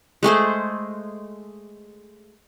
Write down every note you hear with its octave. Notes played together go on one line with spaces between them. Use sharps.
G#3 A3 G#4 C5